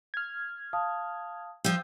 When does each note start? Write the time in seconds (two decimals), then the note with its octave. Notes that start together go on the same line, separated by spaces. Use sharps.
0.14 F6 G#6
0.73 F5 A5 D#6
1.64 F3 F4 G5 E6 G6